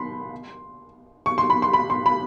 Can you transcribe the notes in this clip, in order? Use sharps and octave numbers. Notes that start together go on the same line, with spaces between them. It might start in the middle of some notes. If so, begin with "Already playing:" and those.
Already playing: B5 C6
C#6
C6
B5
C6
B5
C6
B5